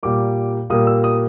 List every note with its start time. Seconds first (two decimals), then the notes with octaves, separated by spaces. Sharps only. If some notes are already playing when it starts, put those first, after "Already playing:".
0.03 A#2 G3 A#3 D6
0.70 A#2 G3 A#3 D#6
0.87 E6
1.04 D#6